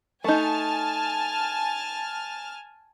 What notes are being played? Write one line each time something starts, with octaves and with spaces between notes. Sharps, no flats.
A3 D#4 G#5 A5 F6